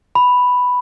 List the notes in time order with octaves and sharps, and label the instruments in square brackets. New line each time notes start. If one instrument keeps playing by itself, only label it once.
[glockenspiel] B5